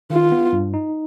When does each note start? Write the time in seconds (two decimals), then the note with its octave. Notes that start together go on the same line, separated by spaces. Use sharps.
0.10 D#3 F4
0.32 B3
0.53 G2
0.74 D#4